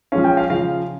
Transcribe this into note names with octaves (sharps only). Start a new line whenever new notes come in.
F3 G#3 C#4 F5
G5
F5
C#3 F3 F5